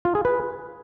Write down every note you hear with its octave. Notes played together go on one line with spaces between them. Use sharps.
F4
G#4
B4